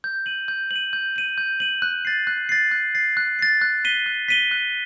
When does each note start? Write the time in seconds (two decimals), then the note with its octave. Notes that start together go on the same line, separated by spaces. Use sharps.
0.04 G6
0.26 D#7 F#7
0.48 G6
0.71 F#7
0.76 D#7
0.93 G6
1.16 D#7 F#7
1.38 G6
1.60 D#7 F#7
1.82 F#6
2.05 A6 C7
2.27 F#6
2.49 A6 C7
2.71 F#6
2.95 A6 C7
3.17 F#6
3.39 A6 C7
3.61 F#6
3.85 B6 D#7 G7
4.06 F#6
4.28 B6 D#7 G7
4.51 F#6